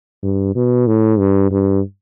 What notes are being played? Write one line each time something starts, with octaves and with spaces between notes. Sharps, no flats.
G2
B2
A2
G2
G2